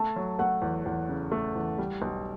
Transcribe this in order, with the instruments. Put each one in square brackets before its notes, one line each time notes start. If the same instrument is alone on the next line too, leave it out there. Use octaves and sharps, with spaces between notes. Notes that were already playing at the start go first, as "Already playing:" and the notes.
Already playing: [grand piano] A3 [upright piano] A5
[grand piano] F#3
[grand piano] A3 [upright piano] F#5
[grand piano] E2
E2
C#3
A3
E2
G3
B1